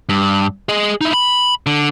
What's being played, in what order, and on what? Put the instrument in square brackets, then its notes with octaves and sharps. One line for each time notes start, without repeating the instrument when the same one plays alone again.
[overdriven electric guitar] G2
G#4 D#5
D#4 E4
B5
D3